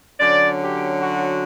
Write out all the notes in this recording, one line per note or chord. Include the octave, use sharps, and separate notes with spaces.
D3 F#3 C#4 D5
G4
F#4